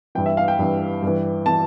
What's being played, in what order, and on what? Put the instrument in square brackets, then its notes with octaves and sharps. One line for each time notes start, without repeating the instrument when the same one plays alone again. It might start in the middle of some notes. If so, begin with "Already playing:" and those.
[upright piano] G2 E3 G5
E5
F5
G5
G2 E3
G2 E3
E3 A5